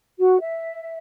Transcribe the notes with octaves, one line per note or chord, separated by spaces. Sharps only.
F#4
E5